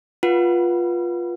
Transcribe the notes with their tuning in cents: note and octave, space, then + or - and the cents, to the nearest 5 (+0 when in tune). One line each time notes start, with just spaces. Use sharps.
F4 +5 B4 -25 F#5 +0